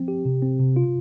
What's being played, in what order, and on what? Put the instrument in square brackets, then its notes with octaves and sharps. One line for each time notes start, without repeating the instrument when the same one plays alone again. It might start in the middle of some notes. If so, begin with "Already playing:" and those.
Already playing: [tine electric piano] F3 C4
G4
C3
C4
C3
F4